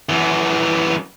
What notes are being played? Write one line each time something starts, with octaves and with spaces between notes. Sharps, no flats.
F#2 E3